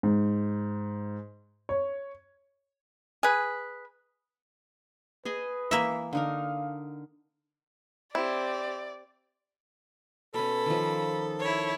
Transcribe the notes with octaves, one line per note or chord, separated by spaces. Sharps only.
G#2
C#5
G#4 B4
G#4 B4 D#5 G#5
E3 A#3 E5
D3 D#4 A#4 F5
C4 E4 G4 D5
B2 C#4 A4 B5
D#3 F3
E4 C#5